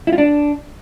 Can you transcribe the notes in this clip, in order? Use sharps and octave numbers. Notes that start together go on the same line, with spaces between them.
E4
F4
D4